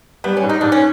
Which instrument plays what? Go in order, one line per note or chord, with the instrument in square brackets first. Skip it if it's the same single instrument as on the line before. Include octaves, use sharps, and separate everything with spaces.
[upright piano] G3 [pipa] B3
[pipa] C#4
[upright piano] G#2
[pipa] D#4
[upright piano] G#2 [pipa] D4
[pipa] C#4